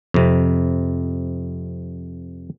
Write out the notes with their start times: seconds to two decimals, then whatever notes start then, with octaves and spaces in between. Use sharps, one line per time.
0.14 F2 C3